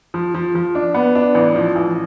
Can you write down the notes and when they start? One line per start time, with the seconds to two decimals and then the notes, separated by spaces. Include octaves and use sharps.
0.14 F3
0.34 F3
0.55 F3
0.75 D4
0.94 B3
1.15 D4
1.35 A1
1.56 F3
1.75 A1